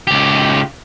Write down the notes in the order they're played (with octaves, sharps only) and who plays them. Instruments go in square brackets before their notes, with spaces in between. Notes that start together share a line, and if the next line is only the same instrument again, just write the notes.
[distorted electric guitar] C#2 G4